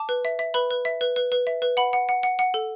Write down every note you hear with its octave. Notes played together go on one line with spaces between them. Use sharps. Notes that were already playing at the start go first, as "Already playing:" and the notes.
Already playing: A5 D6
B4
E5
E5
B4 B5
B4
E5
B4
B4
B4
E5
B4
F#5 B5
F#5
F#5
F#5
F#5
A4